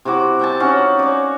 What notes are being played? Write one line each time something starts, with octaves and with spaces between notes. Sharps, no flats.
C3 E4 F#4 D6
E5 G5 A5
C#4 D#4 F#4 F5
C#5 D5